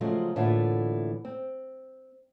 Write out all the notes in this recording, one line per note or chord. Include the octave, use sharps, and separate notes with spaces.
C#3 F3 F#3 G#3 A3
A2 D3 E3 A3 A#3 F4
C4